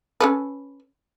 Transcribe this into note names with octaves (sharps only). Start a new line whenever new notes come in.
C#4 A4 B4